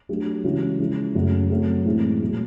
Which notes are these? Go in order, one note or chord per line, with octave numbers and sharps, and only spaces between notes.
F#3 A3 D4 G4
C#3 E3 G#3 C#4 F#4
F3 G#3 C#4 E4
F#2 C#3 F#3 A3
F#3 A3 C4
A2 E3 G#3 C4
A#2 F#3 A3